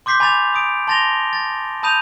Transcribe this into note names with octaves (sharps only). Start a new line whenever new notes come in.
C6 D6 G6 B6 C7
G#5 B5 D6 A6 F7
B5 D#6 D7
A5 C6 A6 A#6 F7 G7
A6
A5 B5 D#6 G6 D#7 F7